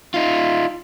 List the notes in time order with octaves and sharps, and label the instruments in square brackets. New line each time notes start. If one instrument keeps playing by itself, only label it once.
[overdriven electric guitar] D#4 F4